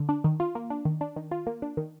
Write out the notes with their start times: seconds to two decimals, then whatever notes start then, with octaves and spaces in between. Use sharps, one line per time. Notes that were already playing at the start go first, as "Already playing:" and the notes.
Already playing: D3
0.09 D4
0.24 D#3
0.40 F4
0.55 A#3
0.70 D4
0.85 D#3
1.01 D4
1.16 D#3
1.31 F4
1.47 A#3
1.62 D4
1.77 D#3